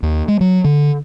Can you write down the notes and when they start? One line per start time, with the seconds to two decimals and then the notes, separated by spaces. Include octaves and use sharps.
0.03 D#2
0.28 G#3
0.41 F#3
0.64 D3